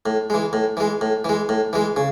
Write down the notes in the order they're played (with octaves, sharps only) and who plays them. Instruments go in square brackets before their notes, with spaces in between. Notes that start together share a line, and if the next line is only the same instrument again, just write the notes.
[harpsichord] A2
E3 G#3
A2
E3 G#3
A2
E3 G#3
A2
E3 G#3
C#3